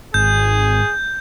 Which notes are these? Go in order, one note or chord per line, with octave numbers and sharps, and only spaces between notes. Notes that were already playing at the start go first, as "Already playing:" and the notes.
G#1 G#2 G#4 G6